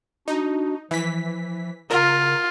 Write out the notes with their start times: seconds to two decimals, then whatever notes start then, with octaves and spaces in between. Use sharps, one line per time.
0.28 D4 D#4 F#4
0.91 E3 F3 B6
1.91 C#3 F4 A#4